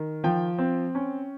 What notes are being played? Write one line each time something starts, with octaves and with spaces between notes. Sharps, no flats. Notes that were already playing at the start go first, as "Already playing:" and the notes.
Already playing: D#3
F3 G5
C4
C#4